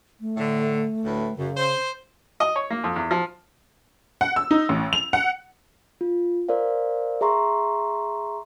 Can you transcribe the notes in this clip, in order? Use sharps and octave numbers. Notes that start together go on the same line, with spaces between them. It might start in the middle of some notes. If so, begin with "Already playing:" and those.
A3
A2 D3
D2 A2 B4
F#2 C#3
C5
D#5
C#5
A#3
F2
E2
F3
F#5
E6
D#4
A1
F7
F#5
F4
A#4 C5 D5 F5
G#4 E5 A#5 C6 C#6